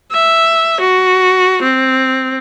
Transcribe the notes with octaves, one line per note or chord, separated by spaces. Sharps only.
E5
F#4
C4